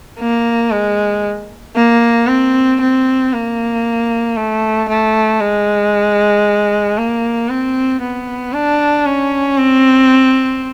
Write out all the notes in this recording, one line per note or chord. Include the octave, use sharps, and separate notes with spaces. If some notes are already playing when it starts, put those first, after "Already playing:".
A#3
G#3
A#3
C4
C4
A#3
A3
A3
G#3
A#3
C4
B3
D4
C#4
C4